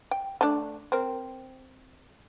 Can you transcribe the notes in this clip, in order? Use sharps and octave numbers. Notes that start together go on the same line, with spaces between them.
G5
A3 D4
C4 A#4